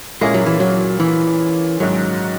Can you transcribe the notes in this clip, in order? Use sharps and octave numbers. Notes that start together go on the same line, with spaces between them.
A#2 G#3 A#3 C#4 E4 G#4
F#3
E3
F#3
E3
G#2 D#3 F#3 G#3 C#4